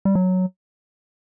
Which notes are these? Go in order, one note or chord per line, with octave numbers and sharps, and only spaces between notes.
G3
F#3